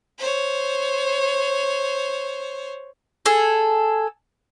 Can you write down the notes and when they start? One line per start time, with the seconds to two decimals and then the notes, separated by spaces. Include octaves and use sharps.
0.19 C5 C#5
3.26 G#4 A4